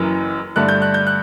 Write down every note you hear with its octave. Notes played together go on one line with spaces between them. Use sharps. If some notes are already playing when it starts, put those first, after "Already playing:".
Already playing: F#1 F#2 E3
G2 D3 A3 F#6
G6
F#6
G6
F#6